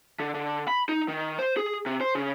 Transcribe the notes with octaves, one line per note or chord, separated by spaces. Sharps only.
D3
D3
B5
D#4
D#3
C5
G#4
C3
C5
C#3